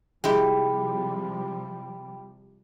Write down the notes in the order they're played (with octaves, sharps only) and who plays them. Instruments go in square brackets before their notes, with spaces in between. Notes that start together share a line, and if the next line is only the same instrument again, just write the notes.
[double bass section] C3 F3 G3 [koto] G#3 E4 G4 [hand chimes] G5 B5